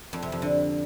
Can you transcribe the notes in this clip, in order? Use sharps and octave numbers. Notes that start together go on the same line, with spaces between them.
F2
C3
F2
D3